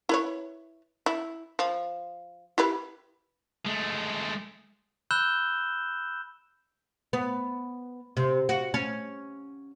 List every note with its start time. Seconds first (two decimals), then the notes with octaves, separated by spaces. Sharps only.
0.09 E4 B4 C#5
1.06 E4
1.59 F3
2.58 E4 G4 B4
3.66 G#3 A3
5.11 B5 E6 F#6 G6 E7 G7
7.13 B3
8.17 C3
8.49 F#4
8.74 C#4